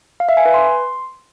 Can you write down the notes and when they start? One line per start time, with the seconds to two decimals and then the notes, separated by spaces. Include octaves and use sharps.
0.20 F5
0.29 E5
0.37 G#5
0.46 B4
0.54 C6